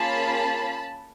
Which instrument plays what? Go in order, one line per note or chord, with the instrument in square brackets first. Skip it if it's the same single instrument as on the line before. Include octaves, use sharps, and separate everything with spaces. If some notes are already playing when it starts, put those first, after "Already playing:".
Already playing: [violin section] A#3 C#4 F4 G#4 A5 B5